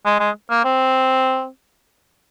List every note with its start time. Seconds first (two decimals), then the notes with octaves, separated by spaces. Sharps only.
0.05 G#3
0.20 G#3
0.50 A#3
0.64 C4